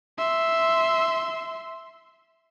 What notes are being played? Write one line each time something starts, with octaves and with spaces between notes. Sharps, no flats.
E5 C6